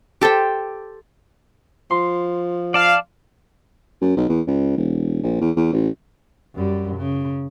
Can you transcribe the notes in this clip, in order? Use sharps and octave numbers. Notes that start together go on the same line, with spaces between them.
G4 A4 C5 G5
F3 C6
D5 F5 A5
F#2
B1
E2
C#2
E1
A#1
E2
E2
A1
F#2 G3
C#3